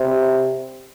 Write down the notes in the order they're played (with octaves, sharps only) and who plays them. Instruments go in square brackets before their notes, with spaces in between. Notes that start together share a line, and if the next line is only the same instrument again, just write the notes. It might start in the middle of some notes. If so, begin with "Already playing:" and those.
Already playing: [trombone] C3